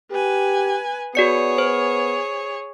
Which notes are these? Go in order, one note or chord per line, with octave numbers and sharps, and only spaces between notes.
G4 B4 G#5
B3 F#4 G#4 C#5 D5 C#7
C5